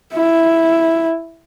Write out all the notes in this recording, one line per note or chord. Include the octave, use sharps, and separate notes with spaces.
E4